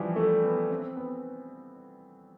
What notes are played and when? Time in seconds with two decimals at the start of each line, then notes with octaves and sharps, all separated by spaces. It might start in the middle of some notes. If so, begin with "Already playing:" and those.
Already playing: E3 F3 G3
0.16 A3
0.44 B3
0.70 C4
0.96 B3